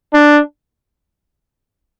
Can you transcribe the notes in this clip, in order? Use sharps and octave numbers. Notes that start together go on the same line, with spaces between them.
D4